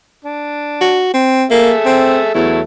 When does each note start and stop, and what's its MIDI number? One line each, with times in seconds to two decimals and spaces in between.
0.25 1.06 62
0.81 1.09 66
1.14 1.45 60
1.51 1.73 58
1.51 2.33 68
1.51 2.33 69
1.51 2.33 76
1.85 2.20 60
2.34 2.60 40
2.34 2.61 54
2.34 2.61 57
2.34 2.61 64